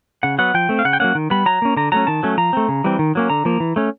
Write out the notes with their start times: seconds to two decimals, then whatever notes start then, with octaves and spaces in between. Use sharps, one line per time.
0.23 C#3 F#5
0.38 F#3 B3 F#5
0.54 F3 G5
0.69 A3 C4
0.79 F5
0.85 C#3 F#5
0.93 G5
1.00 F#3 A#3 C#4 F#5
1.15 D#3
1.30 G3 B3 B5
1.46 F#3 A#5
1.62 A#3 C#4
1.76 D3 A#5
1.92 F#3 A3 C#4 A#5
2.07 D#3 A5
2.23 F#3 A3 C#4
2.38 F3 A#5
2.53 A3 C4
2.68 C#3
2.84 E3 G3 C4
2.99 D#3
3.15 F#3 A#3 C#4
3.30 D3 A#5
3.45 F3 A#3
3.60 E3
3.76 A3 C#4